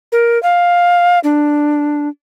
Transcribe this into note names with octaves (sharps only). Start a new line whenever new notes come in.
A#4
F5
D4